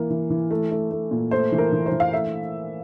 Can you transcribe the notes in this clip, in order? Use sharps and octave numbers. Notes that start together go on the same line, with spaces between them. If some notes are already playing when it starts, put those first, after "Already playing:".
Already playing: E3 A#3
E3
E3
A3
A3
A3
A#2
A3 C5
E3
A#4
E3
C5
E3
F5
A3 E5